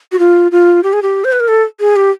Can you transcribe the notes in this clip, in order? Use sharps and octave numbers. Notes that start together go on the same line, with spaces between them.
F#4
F4
F4
G4
G#4
G4
C5
B4
A#4
A4
G#4
G4